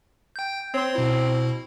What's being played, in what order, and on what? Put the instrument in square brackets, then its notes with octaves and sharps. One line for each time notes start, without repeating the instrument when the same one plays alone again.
[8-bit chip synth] G5 G6
[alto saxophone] C4 [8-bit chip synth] C#5 C6
[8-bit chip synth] B2 E4